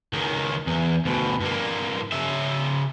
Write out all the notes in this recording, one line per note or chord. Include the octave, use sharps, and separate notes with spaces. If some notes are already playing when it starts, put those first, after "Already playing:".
C#2 D#3
E2
D2 B2
G2 A#3
C#3 E5